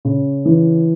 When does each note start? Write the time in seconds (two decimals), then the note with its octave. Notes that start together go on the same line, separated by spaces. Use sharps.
0.05 C#3
0.45 E3